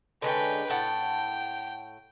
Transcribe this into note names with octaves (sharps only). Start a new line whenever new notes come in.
D3 G#3 C#4 B4 G5
A2 F#5 G5 A5